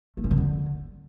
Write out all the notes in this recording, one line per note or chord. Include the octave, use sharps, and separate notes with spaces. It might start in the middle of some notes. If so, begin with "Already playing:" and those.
A3
C#4
D#3
D3